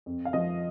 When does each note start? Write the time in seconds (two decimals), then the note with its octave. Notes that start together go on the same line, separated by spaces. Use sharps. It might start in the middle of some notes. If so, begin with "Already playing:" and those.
0.06 F2
0.25 F5
0.33 F3 D#5